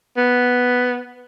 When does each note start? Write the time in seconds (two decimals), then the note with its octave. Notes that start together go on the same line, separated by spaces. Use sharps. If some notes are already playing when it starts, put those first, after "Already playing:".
0.17 B3